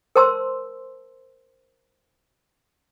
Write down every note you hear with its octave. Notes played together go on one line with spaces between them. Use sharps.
A#4 C5 A5 C6 E6